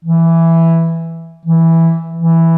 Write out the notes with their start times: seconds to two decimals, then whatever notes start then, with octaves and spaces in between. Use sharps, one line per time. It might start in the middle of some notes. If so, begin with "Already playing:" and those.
0.05 E3
1.45 E3
2.17 E3